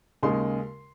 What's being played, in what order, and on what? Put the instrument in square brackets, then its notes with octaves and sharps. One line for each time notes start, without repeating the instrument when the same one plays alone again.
[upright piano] D#2 C#3 G#3 D#4 C6